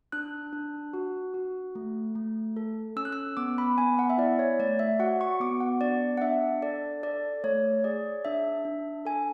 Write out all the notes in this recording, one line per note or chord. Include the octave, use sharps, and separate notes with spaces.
D4 F#6
D4
F#4
F#4
A3
A3
A4
C#4 E6
F#6
E6
B3 D6
B5
B3 G#5
F#5
E5
E4 D5
C#5
A3 D5
E5
F#4 F#5
C#6
B3 D6
F#5
D4 D5
F#5
D4 E5
A4 D5
A4 D5
A3 C#5
G#4 D5
D4 E5
D4
A4 G#5